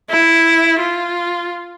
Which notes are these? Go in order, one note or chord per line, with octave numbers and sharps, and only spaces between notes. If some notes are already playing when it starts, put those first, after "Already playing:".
E4
F4